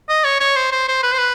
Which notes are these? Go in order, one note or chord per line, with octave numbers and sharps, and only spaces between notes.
D#5
C#5
C#5
C5
C5
C5
B4
C5
B4